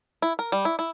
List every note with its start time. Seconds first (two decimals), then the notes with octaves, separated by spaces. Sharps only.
0.22 E4
0.39 A#4
0.52 G3
0.65 E4
0.79 E4